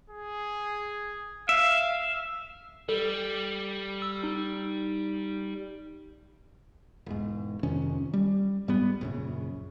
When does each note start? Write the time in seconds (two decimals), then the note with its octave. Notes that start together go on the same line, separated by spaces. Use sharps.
0.10 G#4
1.49 E5 F5
2.89 G3 A4
4.02 E6
4.23 D#4
7.06 E1 G#2
7.63 F2 C3 D#3 C#4
8.14 G3
8.68 G#2 G3 G#3 B3
9.01 A#1 F#2 C#3